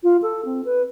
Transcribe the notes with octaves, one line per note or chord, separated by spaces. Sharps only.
F4
A4
C4
B4